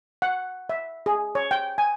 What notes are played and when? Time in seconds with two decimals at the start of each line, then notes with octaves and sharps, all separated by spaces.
0.22 F#5
0.69 E5
1.06 G#4
1.35 C#5
1.51 G5
1.78 G#5